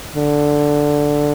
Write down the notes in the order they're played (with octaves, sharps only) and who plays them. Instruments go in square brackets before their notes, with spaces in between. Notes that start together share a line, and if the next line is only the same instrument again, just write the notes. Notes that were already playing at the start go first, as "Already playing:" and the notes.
[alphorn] D3